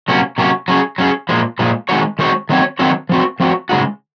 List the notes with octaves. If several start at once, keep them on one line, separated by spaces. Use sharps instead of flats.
C3 F#3 A#3 C#4 F#4
C3 F#3 A#3 C#4 F#4
F#3 C#4 G#4
F#3 C#4 G#4
A#2 F3 G#3
A#2 F3 G#3
D#3 G#3 C4 F#4 C#5
D#3 G#3 C4 F#4 C#5
D#3 F#3 C4 F#4 C#5
D#3 F#3 C4 F#4 C#5
F3 C4 F#4
F3 C4 F#4
C#3 G#3 D#4 F#4